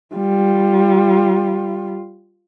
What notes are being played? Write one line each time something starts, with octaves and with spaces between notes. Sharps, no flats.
G3 F4